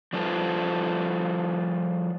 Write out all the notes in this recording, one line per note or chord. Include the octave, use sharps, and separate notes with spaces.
F3 G3 F4 A4 B4 C5